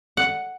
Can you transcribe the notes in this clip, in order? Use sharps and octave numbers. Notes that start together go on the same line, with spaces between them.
F#5